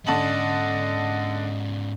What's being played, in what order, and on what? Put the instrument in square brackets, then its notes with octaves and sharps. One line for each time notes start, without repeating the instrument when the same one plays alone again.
[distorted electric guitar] G#2 B3 [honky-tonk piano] D3 A5 F#7 [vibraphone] C#4 D5 [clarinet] D#5